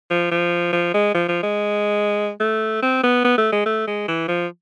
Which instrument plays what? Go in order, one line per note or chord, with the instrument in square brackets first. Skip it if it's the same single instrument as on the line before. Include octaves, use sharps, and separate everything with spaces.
[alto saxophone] F3
F3
F3
G#3
F3
F3
G#3
A3
C4
B3
B3
A3
G#3
A3
G#3
E3
F3